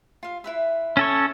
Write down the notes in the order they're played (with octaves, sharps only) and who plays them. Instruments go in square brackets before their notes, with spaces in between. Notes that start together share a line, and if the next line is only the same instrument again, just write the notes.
[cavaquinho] F4 F5
E4 B4 E5
[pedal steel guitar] C#4 A4 C#5